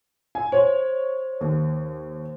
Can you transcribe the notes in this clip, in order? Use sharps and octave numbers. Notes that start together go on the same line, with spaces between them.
G#5
C5 C#5
D#2